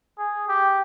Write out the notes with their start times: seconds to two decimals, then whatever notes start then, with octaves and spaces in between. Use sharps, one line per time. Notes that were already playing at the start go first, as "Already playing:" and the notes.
0.18 G#4
0.48 G4